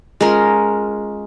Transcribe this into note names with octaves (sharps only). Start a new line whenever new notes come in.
G#3 C#4 F4 A#4